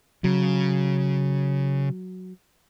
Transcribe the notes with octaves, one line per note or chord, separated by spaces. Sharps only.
C#3 F#3